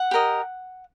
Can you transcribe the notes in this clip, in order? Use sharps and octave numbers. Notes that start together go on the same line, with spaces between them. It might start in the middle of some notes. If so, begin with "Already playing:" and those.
Already playing: F#5
G4 A#4 D#5